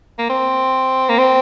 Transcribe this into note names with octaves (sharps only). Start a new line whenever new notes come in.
A#3
C4
A#3
C4